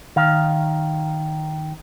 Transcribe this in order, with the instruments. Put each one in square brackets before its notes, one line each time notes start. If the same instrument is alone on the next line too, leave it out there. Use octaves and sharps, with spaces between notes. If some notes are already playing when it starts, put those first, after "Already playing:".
[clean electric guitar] D#3 F5